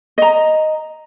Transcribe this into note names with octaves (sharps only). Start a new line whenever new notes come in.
D#5 A#5